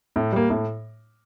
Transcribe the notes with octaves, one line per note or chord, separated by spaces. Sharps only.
A2
G3 A#3
A2